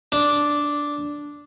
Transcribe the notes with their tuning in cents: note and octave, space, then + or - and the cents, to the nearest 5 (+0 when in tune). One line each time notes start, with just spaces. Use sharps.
D4 -5